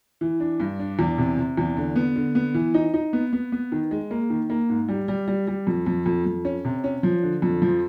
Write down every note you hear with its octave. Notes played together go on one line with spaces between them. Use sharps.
E3
D4
G2
D4
E2
C3
C3
E2
D3
B3
D3
B3
E3
D#4
D#4
B3
B3
B3
D#3
G#3
A#3
D#3
A#3
G#2
G3
G3
G3
G3
F2
F2
F2
F2
C#4
C3
C#4
F3
D3
F2
F3